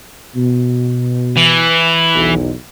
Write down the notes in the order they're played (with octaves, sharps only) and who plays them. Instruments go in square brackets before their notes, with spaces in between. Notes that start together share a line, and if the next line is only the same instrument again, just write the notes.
[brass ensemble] B2
[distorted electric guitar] E3
[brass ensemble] B1 E2